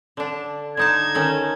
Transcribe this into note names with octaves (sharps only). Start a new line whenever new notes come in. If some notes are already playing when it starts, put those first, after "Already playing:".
D3 D4
D3 D#4 A5 G#6
D#3 C#4 A4